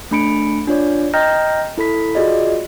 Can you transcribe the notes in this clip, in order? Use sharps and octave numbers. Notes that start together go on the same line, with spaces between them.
A3 D4 B5 C#7 D7
D4 F4 C#5 D5
D#5 G5 A#5 F6 G6 A#6
E4 A4 B5 B6
F4 F#4 G#4 D5 D#5